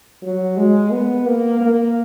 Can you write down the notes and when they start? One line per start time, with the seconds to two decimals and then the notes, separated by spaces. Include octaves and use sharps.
0.22 F#3
0.57 G#3
0.92 B3
1.26 A#3
1.61 A#3